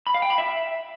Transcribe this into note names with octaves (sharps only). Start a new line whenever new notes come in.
B5
F5
G5
B5
E5